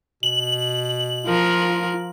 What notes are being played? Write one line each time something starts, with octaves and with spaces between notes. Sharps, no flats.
B2 F#7
F3 F4 A#4